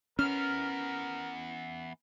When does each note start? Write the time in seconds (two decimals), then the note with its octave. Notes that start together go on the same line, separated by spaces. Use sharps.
0.19 E3 B3 C#4 A#4 F6